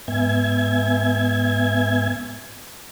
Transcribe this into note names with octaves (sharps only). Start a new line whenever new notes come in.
G#2 B3 E5 G#5 G#6